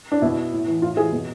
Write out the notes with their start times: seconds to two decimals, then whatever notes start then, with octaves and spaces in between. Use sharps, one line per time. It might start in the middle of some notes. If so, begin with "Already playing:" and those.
0.12 D4
0.22 B2 E4
0.52 A2
0.67 E3
0.82 A2 F4
0.97 E3 G#4
1.12 B2